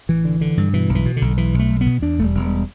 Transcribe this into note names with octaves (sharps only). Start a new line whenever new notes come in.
A1 E3
D3
D3
G2
B2 E3
B1
E3
B2
D3
B1
B1 E3
B1
A3
B1
B3
B2
E2 D4
E1 A3
G3
E1
G3